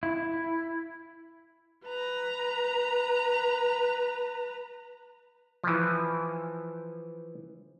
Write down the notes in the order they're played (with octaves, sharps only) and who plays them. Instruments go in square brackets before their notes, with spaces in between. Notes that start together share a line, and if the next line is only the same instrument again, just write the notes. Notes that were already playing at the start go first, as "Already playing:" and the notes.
[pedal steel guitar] E4
[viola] B4 A#5
[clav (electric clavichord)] E3 F3